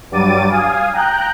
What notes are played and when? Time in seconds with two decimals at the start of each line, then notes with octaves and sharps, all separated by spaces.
0.11 G2 F#3 G3 D6 A6 D#7
0.50 F5 G#5 D#6
0.92 G5 A#5 F#6 G6